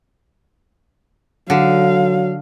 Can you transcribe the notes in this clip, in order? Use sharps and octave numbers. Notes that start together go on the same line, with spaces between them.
D3 F#3 F5